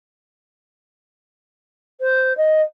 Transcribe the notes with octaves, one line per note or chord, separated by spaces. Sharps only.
C5
D#5